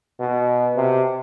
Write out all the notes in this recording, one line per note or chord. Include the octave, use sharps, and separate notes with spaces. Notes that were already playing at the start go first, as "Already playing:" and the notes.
B2
C3